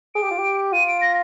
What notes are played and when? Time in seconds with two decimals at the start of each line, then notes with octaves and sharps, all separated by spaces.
0.15 G#4 D7
0.23 G4
0.31 F4
0.39 G4
0.73 F4 D#7
0.88 D7
1.01 A#6